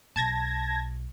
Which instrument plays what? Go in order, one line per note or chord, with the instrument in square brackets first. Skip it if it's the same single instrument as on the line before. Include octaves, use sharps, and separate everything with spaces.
[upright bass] B1 B2 [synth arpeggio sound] A5 G#6 A#6